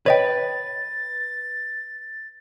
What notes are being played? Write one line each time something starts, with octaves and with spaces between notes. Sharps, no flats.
B4 C#5 D#5 G5 A6